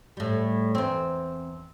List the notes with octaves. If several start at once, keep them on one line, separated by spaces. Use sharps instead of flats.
A2 G3
E2 C4